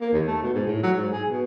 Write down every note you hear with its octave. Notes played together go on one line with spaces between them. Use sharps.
A#3
D#2
A3
B2
G#2
A2
F#3
G#2
G#4
B2